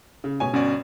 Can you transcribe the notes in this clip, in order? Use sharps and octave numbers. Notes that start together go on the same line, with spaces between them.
C#3
B2 C#5 G#5
G1 C#4 F#4 D5